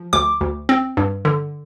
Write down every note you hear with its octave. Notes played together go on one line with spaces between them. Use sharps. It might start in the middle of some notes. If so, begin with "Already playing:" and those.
Already playing: F3
D2 D6
D2
C4
G2
D3